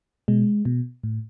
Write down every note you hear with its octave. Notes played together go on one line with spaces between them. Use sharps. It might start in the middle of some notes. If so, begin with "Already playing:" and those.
B2 G#3
B2
A2